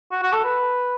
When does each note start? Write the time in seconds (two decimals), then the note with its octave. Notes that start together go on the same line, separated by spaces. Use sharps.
0.12 F#4
0.22 F#4
0.33 A4
0.44 B4